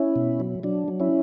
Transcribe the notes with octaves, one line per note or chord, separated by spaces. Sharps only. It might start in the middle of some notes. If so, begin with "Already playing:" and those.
Already playing: C#4 E4
B2
F#3
F#3 D4
F#3
C#4 E4